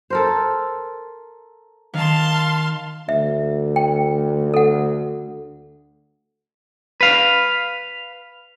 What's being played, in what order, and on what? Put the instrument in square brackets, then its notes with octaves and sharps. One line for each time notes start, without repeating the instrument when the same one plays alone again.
[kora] A4 A#4 C5
[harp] D#3 [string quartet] F5 A5 C6
[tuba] D2 [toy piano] E5
[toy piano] G5
A4 F#5
[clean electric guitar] B4 F5